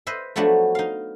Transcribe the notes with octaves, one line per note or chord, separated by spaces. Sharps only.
B4 C5 D#5 E5
F3 F#3 A3 B3 D4 F#4
D#4 F5